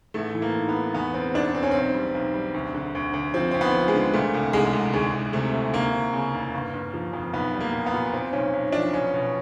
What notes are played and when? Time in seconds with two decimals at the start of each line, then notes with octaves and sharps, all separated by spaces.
0.14 A1 A3
0.35 E3
0.42 A#3
0.55 G#2
0.69 B3
0.75 G#2
0.94 E2 B3
1.14 E1 C4
1.34 E1 D4
1.54 E1 C4
1.63 C#4
1.71 B1 C4
1.94 G3
2.15 B1
2.34 G3
2.54 D2
2.74 D3
2.95 D2
3.14 D2
3.34 F3 C4
3.51 D2 C4
3.61 B3
3.74 F3
3.88 G#3
3.95 D3
4.14 A#2 A3
4.34 C2
4.53 C2 G#3
4.73 C2
4.93 D2 G#3
5.13 D2
5.33 C3 A3
5.54 D2
5.73 D2 A#3
5.93 D2
6.13 C#3
6.34 E1
6.54 G1
6.73 G1
6.94 F3
7.13 F2
7.33 B1 B3
7.53 G3
7.60 A#3
7.73 A#2
7.86 B3
7.94 A#2
8.13 A#2 C4
8.33 B1 C#4
8.53 B1
8.73 F3 D4
8.93 B2 C#4
9.13 B2